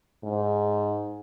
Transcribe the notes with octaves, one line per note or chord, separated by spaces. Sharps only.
G#2